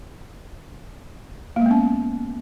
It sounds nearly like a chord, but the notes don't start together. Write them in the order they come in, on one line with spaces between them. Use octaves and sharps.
A#3 G#3 B3 C#4